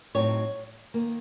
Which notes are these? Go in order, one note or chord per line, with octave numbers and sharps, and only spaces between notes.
A2 F#3 C4 D#4 C#5
D#3 A#3